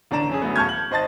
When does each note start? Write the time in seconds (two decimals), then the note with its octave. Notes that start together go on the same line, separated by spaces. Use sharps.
0.11 A1 D3 D5 A#5 E7
0.29 F#2 C#4 G#4
0.42 D2 F#3 A3 B3
0.56 E1 A5 C#6 F6 G6 G#6
0.69 F#7
0.91 G#1 C5 D#5 A5 A6